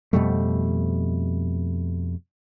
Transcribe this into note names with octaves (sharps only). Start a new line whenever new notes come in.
F2 B2 G3 A3